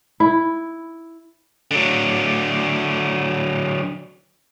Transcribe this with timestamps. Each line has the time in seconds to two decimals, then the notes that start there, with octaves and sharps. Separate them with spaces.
0.20 E4
1.71 D3 F#3